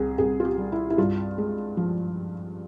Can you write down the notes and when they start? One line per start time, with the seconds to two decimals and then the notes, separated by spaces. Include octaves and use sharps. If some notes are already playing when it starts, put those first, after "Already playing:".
Already playing: C2 G#4
0.18 C2 G#4
0.40 F4
0.45 G4
0.58 G3
0.72 E4
0.90 E4
0.98 G2 F4
1.38 G#3
1.77 F3